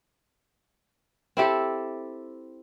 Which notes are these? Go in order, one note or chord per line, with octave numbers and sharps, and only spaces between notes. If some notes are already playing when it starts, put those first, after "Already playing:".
C4 E4 G4 A4